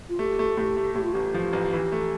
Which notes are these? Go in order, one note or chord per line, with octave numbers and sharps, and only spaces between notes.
F4
A3 G4
A3
A2 G4
A3
A2 G4
F4
A1 G4
F3
A1
E3
A3